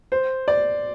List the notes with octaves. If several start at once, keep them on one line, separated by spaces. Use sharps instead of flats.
C5
D5